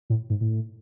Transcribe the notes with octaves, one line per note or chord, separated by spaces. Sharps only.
A2
G#2
A2